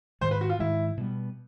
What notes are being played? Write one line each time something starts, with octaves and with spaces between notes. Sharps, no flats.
G#2 D#3 G#3 C5
B4
F#4
F4
G#2 D#3 G#3 E4
B2 G3 B3